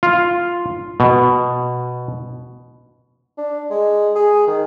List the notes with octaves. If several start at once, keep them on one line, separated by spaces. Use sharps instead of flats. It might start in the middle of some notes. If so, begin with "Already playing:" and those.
F4
B2
D4
G#3
G#4
D#3